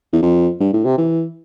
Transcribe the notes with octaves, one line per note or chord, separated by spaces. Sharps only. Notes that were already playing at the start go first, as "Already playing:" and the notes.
E2
F2
G2
A2
C3
E3